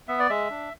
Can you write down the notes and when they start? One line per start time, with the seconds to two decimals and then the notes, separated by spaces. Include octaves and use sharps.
0.08 B3 E5
0.19 D5
0.29 G#3 E5
0.50 D4